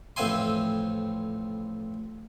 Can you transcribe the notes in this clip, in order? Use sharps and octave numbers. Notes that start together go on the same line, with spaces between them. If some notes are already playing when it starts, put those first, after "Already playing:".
A1 F2 C4 E5 G#5 C6